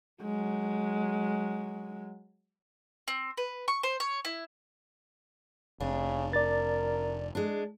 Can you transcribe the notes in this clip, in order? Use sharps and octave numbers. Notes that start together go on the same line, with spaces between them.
F#3 G#3
C4
B4
C#6
C5
C#5
E4
F1 C#3 D4
A#4 D5 A6
G#3 D4